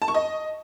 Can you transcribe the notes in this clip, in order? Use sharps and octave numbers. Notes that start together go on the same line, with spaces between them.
A5
C#6
D#5